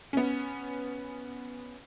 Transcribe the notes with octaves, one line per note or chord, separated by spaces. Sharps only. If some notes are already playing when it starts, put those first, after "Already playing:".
B3 C#4